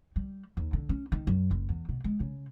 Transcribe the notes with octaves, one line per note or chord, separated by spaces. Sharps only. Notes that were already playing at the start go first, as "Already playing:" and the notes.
G3
D#2
D3
C#4
D#3
F#2
F#1
E2
B2
G#3
C#3